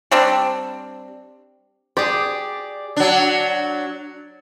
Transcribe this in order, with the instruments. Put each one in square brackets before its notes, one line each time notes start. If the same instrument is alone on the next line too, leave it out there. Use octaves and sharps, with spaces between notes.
[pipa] G3 C4 D4
[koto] G4 G#4 [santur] D5
[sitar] F#3 D4